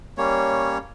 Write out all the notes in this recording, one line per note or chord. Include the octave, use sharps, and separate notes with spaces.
G3 A#3 C#4 C#5